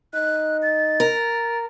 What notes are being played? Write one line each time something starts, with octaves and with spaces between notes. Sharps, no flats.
D#4 F#6
A6
A#4